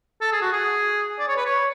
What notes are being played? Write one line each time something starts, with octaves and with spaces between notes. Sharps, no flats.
A4
G#4
F#4
G#4
D5
C#5
B4
C#5